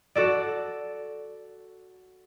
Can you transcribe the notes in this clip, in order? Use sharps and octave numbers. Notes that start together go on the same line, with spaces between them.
F#4 A4 D5